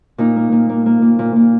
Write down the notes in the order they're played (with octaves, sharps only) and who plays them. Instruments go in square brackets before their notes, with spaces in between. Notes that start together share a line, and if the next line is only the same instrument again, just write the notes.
[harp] A#2 D#4
A#3
A#2
A#3
A#3
A#2
A#2
A#2